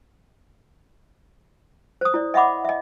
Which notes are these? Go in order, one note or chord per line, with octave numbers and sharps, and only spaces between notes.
C5 D#6
E4 D5
D#5 E5 F#5 B5 D6
D#5 E5